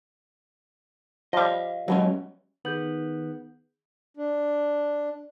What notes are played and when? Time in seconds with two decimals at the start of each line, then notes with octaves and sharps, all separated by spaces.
1.33 F3 G3 D#5 F5
1.88 D#2 B2 F#3 G#3 C#4
2.65 D#3 B3 G#4 G6 F#7
4.17 D4